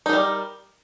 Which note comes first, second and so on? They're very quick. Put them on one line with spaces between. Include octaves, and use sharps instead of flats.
D#4 A#4 G3